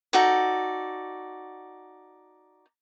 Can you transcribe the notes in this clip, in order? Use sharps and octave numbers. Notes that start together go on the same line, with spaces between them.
D#4 F#4 A4 D5